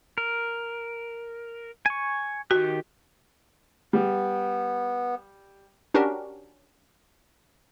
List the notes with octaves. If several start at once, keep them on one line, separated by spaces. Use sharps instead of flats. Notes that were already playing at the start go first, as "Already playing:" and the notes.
A#4
G#5 C#6
D#3 F#4 G4
G3 B3
C#4 D4 F#4 G4 A#4